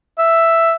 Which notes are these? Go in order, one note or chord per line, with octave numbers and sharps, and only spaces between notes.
E5